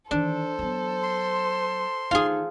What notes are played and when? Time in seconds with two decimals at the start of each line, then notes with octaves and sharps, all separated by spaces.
0.11 D#3 E3 D4 A4 C5
0.59 F#3 B3
1.03 C6
2.11 D#3 D#4 F4 G#4